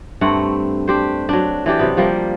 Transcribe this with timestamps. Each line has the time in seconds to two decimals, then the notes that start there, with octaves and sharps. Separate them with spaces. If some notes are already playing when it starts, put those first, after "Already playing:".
0.21 G2 A3 C4 F#5
0.87 D4 G4 C5
1.29 F#3 D4
1.66 E3 D4 G4 D5
1.79 C3 F#3 B3
1.97 F3 G3 A#3